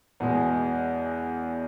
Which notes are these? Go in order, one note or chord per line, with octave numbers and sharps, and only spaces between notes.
E2 B2 G#3